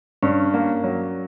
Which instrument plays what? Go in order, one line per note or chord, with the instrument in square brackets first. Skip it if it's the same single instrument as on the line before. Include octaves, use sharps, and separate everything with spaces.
[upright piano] G2 [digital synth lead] C#4
[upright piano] A#3
F#3